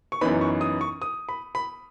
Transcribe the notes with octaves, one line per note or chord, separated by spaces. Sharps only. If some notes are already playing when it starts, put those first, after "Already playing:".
C#6
F#2 E3 B3 D#4 B5
C#6
D#6
C#6
D#6
B5
B5